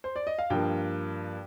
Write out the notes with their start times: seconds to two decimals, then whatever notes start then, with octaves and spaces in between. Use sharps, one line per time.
0.04 C5
0.16 D5
0.27 D#5
0.38 F5
0.50 G2 F3 A#3 G5